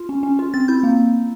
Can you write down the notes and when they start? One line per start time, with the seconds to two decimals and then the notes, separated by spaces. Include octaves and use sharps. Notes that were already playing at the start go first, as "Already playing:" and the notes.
Already playing: F4
0.09 C#4
0.23 C#4
0.39 F4
0.54 C4 A6
0.68 E4 G6
0.83 A#3